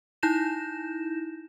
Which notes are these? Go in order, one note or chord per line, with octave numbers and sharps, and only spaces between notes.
D#4 E4 G6 A#6 E7